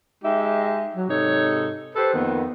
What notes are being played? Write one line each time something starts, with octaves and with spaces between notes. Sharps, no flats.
G#3 D#4 G4 E5
F#3
G#2 C3 D#4 A4 C#5
G4 A4 B4 C5
F2 D#3 A#3 B3